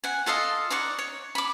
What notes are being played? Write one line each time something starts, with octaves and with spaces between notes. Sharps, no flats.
F#5 G#5
F4 A4 D#5 F5
D#4 D5 F#5 C#6
C#5
B5 D6